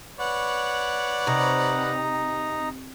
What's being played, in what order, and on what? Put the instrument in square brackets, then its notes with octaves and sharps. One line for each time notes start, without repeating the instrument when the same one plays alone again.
[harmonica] B4 C#5 D5 [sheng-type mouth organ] F#5
[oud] C3 [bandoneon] D#4 A#5